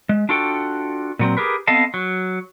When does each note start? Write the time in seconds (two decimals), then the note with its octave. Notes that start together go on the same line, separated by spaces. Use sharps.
0.09 G#3
0.29 D4 F4 F#4 A4 G5
1.19 A#2 F#3 C4
1.37 G4 G#4 A#4 B4
1.67 B3 C4 A4 D#5 F5 A5
1.94 F#3